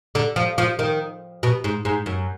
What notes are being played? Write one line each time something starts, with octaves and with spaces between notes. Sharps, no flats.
D3
F3
F3
D#3
B2
G#2
G#2
F#2